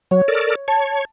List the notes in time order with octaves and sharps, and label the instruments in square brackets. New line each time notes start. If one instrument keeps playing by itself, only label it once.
[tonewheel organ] F#3 [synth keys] C#5
[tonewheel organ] A4 A#4 D5
[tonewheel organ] C#5 [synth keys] A5